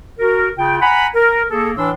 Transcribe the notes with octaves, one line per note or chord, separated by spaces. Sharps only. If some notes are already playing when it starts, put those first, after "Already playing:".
F#4 A#4
C#3 F4 G5
F#5 G#5 A#5 B5
A#4
A#3 G#4 A4
A2 E3 D4 C6 E6